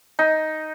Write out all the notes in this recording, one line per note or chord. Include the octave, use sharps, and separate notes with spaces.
D#4